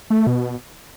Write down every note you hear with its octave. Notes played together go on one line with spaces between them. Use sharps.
A3
B2